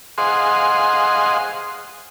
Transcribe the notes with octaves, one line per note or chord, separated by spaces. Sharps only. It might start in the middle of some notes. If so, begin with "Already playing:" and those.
G#4 C5 D#5 F5 F#5 C6